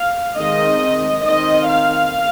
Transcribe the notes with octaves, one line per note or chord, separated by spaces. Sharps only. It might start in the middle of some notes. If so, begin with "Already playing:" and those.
Already playing: F5
D#3 G#3 C4 D#5
D#3 C4 D#5
F5